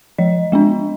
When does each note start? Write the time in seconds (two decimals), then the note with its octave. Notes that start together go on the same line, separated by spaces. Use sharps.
0.18 F3 D#5
0.52 G#3 B3 D4